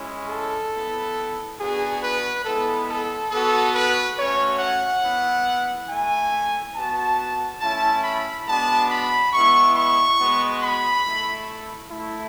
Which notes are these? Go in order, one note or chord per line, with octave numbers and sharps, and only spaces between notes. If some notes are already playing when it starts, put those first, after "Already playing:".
Already playing: G#3 C#4 E4
A4
B3 E4
B3 D4 F#4 G#4
B4
G#3 B3 E4 A4
A4
B3 F#4 A4
B4
A3 C#4 F#4 C#5
F#5
B3 E4
A3 E4 G#5
B3 F#4 A5
A3 C#4 E4 A5
B5
G#3 B3 D4 F#4 A5
B5
G#3 B3 E4 C#6
C#6
G#3 B3 F#4
B5
A3 E4
A3 E4